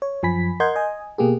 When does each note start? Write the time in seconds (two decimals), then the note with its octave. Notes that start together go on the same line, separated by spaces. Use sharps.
0.02 C#5
0.23 F#2 F3 G#5 B5 B6
0.60 A#4 D#5 F#5 C6 G6 G#6
0.76 D#5 G#5
1.18 B2 A#3 G4 G#4